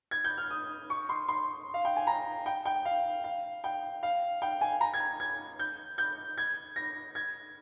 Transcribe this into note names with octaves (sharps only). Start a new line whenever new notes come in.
G#6
G6
F6
D#6
C#6
C6
C6
F5
G5
G#5
A#5
G5
G5
F5
F5
G5
F5
G5
G#5
A#5
G#6
G#6
G6
G6
G#6
A#6
G#6